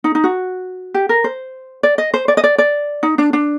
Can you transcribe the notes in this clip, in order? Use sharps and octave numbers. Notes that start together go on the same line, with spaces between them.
D#4
D#4
F#4
G4
A#4
C5
D5
D#5
C5
D5
D#5
D5
D5
D#4
D4
D4